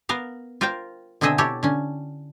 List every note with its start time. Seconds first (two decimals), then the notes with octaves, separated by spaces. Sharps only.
0.09 B3 A#4 F5
0.61 F4 A#4 C5 F5 G5
1.21 B2 D3 C4 G#4 D#5 E5
1.38 E4 G4 A4 C#5
1.63 D3 C#4